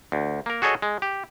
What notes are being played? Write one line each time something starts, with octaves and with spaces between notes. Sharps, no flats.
D2
A#3 A#4
F#4 G#4 A4 C#5 D#5
G#3
G4